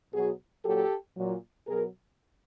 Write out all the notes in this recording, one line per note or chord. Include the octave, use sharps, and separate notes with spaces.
B2 F#3 F#4 G#4
A#2 F#3 G4 A4
A#2 F#3
B2 F#3 G#4 A#4